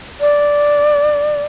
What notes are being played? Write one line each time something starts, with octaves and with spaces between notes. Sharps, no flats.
D5